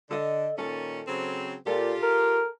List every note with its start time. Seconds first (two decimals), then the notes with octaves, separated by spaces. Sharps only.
0.11 D3 A4 D#5
0.58 A#2 D#3 C#4 A4
1.08 C#3 F#3 C4
1.67 A#2 F4 G4 A4
2.02 A#4